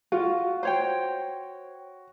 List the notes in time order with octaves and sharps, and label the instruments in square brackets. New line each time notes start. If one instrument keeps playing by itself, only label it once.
[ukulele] F4 [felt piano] F#4
[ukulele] C5 C#5 G5